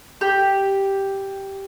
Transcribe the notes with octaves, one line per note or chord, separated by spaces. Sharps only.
G4